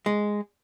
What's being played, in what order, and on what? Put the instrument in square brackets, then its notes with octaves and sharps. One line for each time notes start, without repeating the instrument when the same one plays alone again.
[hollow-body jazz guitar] G#3